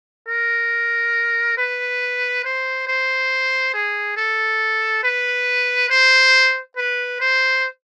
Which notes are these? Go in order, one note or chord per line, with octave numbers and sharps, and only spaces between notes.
A#4
B4
C5
C5
G#4
A4
B4
C5
B4
C5